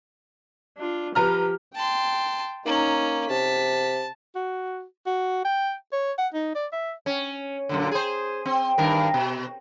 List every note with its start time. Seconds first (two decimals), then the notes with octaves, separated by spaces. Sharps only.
0.78 D4 F4
1.15 F3 G4 B4 A#5 F6
1.75 G5 A5 C6
2.66 A#3 C#4 D#4 A#5
3.30 C3 A5 B6
4.35 F#4
5.06 F#4
5.44 G5
5.92 C#5
6.18 F#5
6.34 D#4
6.55 D5
6.72 E5
7.06 C#4
7.69 F#2 A#2 D3
7.92 G#4 C5
8.46 C4
8.78 G2 D#3 A#4
9.14 B2